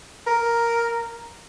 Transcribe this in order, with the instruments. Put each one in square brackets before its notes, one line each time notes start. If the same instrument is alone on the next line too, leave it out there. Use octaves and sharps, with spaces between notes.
[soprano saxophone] A#4